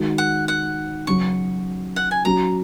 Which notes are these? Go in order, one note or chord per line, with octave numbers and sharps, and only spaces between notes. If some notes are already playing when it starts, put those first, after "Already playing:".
Already playing: D#3 G#3 D#4 F#4
F#5
F#5
C#3 F#3 C#4 F#4 C#6
F#5
G#5
F#3 C#4 F#4 A#5